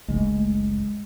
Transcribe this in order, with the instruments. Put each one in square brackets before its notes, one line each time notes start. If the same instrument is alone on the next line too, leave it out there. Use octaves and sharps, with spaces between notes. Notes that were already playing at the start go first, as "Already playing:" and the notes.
[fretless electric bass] F#1 C#2 [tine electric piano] G#3 [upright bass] A3